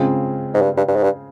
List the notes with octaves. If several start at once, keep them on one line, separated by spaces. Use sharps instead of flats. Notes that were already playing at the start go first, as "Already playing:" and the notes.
Already playing: C#3 G#3 C4 F4 G#4
G#2
G2
G2
G2
G#2
G2